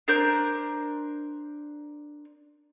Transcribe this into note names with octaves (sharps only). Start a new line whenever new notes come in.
D4 A#4 C5 G6